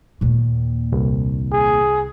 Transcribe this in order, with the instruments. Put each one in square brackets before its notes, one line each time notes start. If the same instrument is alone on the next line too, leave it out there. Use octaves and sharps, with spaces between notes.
[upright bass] D#2 A#2
[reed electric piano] C2
[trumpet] G#4